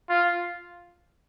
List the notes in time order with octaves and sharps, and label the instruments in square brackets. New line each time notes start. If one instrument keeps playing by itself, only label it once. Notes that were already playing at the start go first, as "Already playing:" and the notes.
[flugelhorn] F4